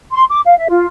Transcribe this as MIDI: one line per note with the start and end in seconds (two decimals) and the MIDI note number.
0.12 0.24 84
0.30 0.40 86
0.45 0.56 77
0.57 0.68 76
0.69 0.87 65